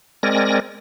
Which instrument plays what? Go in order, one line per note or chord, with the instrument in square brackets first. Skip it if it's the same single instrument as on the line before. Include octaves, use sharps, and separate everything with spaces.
[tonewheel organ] G#3 C4 A#4 D5 G#5 A#6